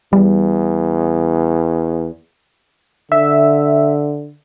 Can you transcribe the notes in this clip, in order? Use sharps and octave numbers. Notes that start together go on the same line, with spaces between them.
E2 G3
D3 E5